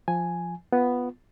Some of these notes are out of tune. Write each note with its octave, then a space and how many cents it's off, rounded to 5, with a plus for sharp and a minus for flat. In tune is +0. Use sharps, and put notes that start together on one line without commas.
F3 +0 G#5 +0
B3 +0 F4 +0